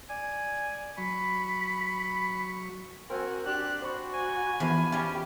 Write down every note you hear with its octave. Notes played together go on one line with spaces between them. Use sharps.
D5 G#5
F#3 B5 C#6
C4 F#4 A#4 G#5
D4 G4 F#6
F#4 C5 D5 B5 C#6
G#5
E2 F3 B5
G3 C#4 F4 G4